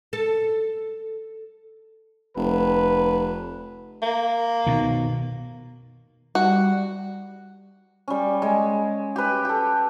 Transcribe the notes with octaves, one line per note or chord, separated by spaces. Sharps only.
A4
F1 B4
A#3
B2 D#3
G3 F#4
G3 C#4
G#3
G4 B4
G4 A4